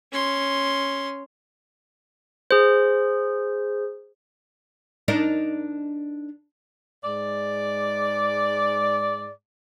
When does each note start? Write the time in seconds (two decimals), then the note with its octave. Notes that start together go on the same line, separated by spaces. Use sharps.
0.12 C#4 C6
2.51 G#4 C5
5.08 D4 D#4 A#4
7.04 G#2 G#3 D5